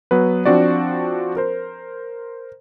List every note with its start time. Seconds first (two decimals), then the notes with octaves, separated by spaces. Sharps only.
0.11 F#3 B3 B4
0.45 F3 C4 D4 F#4 D5
1.37 A#4 C5